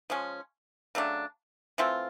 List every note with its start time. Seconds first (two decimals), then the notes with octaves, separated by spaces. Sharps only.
0.10 F3 G#3 C#4
0.95 C#3 F#3 A3 D4
1.78 E3 A3 C4 F4